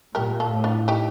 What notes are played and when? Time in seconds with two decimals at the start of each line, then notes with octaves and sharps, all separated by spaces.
0.15 A#2 G4 A#4
0.40 F4 A4
0.51 A2
0.64 D4 F4
0.88 D#4 G4